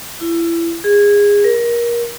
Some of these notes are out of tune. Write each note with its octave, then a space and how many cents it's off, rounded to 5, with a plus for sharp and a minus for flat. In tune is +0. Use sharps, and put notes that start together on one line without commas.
E4 +25
G#4 -20
A#4 +25